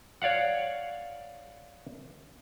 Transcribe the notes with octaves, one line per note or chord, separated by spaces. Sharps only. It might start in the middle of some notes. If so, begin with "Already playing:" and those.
C#5 D5 F5 F#5